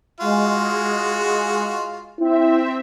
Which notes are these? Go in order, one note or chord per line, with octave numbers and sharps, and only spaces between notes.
G#3 F4 F#4
C4 E4 E5